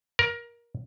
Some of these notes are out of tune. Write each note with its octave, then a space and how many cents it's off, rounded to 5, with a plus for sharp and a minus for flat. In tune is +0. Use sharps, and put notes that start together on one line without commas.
A#4 +20